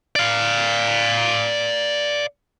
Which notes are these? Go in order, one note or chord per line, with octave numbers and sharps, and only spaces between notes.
D5 F5